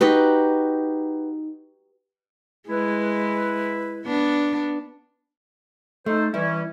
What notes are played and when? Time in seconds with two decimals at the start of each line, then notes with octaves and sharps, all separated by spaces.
0.01 D#4 F#4 G4 B4
2.69 G#3 E4 B4
4.06 B3 D4
6.06 A3 D#4 A4 C5
6.34 E3 G3 C#4 E4